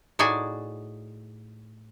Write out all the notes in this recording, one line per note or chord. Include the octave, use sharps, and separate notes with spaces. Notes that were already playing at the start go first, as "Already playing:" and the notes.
A2 D#4 F#4 G#4 D5 G#5